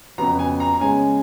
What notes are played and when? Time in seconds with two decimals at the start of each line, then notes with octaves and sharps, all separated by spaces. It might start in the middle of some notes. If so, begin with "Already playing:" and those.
0.18 F2 C#3 F#3 B3 A#5
0.39 G#5
0.60 A#5
0.74 A#5
0.80 C#3 G#3 C#4 G#5